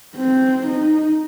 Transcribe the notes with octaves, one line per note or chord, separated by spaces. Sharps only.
C4
D#4